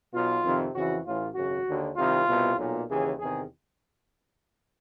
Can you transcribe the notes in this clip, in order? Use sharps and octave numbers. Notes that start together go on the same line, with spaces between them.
B1 B2 F4
F2 C3 D#3
F2 C#3 E3 F#4
A1 A2 E3 F4
G#1 F#2 C#3 F#4
D#2 D3
C2 C3 D#3 F4
C2 B2
B1 A#2
D#2 C#3 E3 G#4
E2 C3 D#3 G#4